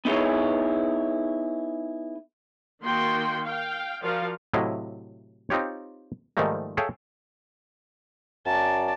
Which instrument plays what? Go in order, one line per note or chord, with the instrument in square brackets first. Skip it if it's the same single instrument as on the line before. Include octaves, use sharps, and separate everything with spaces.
[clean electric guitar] B3 D#4 E4 G#4 C#5
[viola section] D#3 A#3 F#4 G5 C6
F5 G5
F3 F4 F#4 A#4 D5 F5
[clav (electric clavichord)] A2 C3 F#3 E4 D#5 F5
C4 D#4 F4 G4 C#5
G#2 D#3 F3 G3 A3 A#3
G#4 A4 C#5 E5 F5 G5
[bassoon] F#2 [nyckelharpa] D5 A5